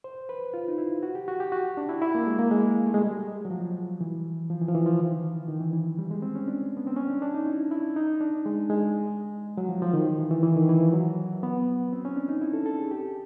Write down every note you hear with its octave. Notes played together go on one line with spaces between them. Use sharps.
C5
B4
F4
D#4
E4
F#4
G4
F#4
G4
F#4
D4
E4
E4
A#3
G#3
A#3
G#3
A3
G#3
G3
F#3
F3
E3
F3
E3
F3
E3
F3
D#3
E3
D#3
E3
E3
F3
G3
G#3
C4
C#4
D4
B3
C4
C#4
D4
D4
D#4
E4
E4
D#4
D4
G#3
G#3
F#3
F3
F3
D#3
E3
E3
E3
D#3
E3
F3
F#3
B3
C4
C#4
D4
D#4
E4
A4
A4
G#4
G4